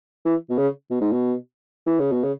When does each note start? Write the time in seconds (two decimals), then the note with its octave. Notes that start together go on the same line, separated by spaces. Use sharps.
0.26 E3
0.50 B2
0.58 C#3
0.91 B2
1.01 G#2
1.12 B2
1.87 E3
2.00 C#3
2.12 B2
2.24 C#3